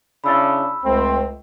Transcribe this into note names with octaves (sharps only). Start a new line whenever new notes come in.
C#3 D4 E4 B5 E6 A6
C#2 A3 C4